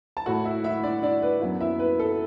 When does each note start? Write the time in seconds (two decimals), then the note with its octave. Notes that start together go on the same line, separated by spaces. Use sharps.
0.17 A5
0.26 A2 A3 F#4 F#5
0.45 E4 E5
0.64 E4 E5
0.84 D4 D5
1.03 D4 D5
1.22 B4
1.42 F#2 F#3 B3
1.60 E4 E5
1.79 B4
1.99 A4